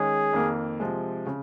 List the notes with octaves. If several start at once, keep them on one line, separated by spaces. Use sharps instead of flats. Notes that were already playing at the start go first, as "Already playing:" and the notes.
Already playing: D#3 G#3 C#4 G#4
F2 D#3 A#3
C3 F3 G#3
C#3